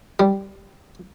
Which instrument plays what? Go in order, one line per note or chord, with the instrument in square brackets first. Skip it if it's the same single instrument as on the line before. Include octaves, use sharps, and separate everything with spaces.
[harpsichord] G3